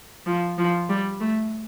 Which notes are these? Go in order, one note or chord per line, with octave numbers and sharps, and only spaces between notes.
F3
F3
G3
A3